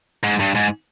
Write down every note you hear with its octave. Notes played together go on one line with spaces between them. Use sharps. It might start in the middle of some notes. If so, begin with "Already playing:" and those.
G#2
G2
G#2